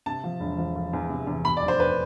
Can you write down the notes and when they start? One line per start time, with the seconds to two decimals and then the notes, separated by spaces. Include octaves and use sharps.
0.06 C3 A5
0.24 F3
0.40 E1
0.58 F3
0.76 F3
0.93 E2
1.09 C3
1.27 E2
1.45 B2 B5
1.57 D5
1.63 F1
1.68 C5
1.79 F1 B4